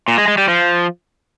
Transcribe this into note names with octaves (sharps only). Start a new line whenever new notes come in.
A#2
G#3
G#3
G3
F3